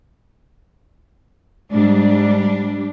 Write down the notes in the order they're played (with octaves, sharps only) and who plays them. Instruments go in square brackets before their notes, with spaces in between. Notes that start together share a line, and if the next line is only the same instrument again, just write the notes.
[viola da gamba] G#2 [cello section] G3 D4